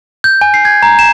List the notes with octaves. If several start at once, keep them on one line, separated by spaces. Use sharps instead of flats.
G6
G#5
C7
G#6
A#5
E7